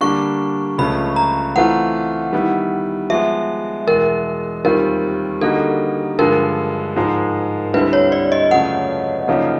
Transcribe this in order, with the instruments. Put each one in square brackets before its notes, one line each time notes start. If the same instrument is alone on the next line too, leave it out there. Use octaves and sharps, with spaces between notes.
[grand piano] D3 G3 A#3 D4 [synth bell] C#6
[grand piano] C#2 C#3 F3 A3 C#4 [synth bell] B5
[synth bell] A#5
[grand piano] E3 A3 C4 F4 [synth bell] F#5
[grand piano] D#3 G3 B3 E4
[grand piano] F3 G#3 B3 [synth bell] E5
[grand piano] E2 B2 G#3 [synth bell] A#4
[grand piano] D#2 D#3 G3 C4 F4 [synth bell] A#4
[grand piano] D3 G3 A#3 D#4 F#4 [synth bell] A4
[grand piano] G2 D3 F3 G#3 [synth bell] A#4
[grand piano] G#2 F3 G#3
[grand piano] D2 D3 G3 C4 E4 [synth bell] B4
[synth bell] C#5
D5
D#5
[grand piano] F#2 C#3 F3 A3 [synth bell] F#5
[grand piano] F#2 C#3 F3 A#3 D#4